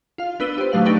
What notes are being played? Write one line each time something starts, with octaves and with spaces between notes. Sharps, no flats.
F4 F5
B3 D4 B4 E6 D#7 G7
G4 C5
D3 D#3 F#3 A3 F5 F#7
D4 D#4 G4 B4 C#6